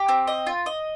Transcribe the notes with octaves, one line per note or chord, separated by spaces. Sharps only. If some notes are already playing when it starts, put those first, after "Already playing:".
Already playing: G4
C4
D#5
F4
D#5